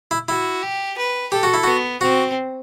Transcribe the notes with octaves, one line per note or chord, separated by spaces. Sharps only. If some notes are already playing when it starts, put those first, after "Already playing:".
E4
E4 F#4
G4
B4
G4 A4
F#4
E4
B3 F#4
C4 F#4